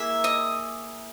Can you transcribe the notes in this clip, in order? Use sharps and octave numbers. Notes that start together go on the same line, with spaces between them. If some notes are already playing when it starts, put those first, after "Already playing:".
Already playing: A#3 E4 G#4 E5
D#5